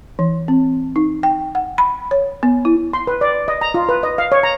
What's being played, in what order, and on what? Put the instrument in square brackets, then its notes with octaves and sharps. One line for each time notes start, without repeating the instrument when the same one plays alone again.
[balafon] E3
C4
D#4
G5
F#5
B5
C#5
B3
E4
[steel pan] C6
B4
D5
D#5
A#5
F4
B4
D#5
F5
C#5
A#5